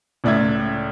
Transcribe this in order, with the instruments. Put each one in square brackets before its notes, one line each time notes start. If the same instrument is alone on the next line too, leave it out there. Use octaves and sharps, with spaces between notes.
[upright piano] C#2 A2 D5 E5 G#6